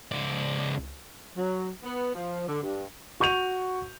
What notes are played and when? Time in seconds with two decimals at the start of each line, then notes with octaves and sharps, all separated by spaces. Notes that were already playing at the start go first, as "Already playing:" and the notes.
0.12 C#2 D5
1.36 F#3
1.83 B3
2.15 F3
2.47 D3
2.63 G2
3.20 F#4 C#6 G6 D#7 F7